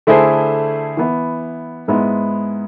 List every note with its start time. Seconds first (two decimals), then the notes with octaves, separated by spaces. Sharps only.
0.07 D3 A3 E4 G#4 C5
0.97 E3 B3 E4
1.88 G#2 G#3 B3 E4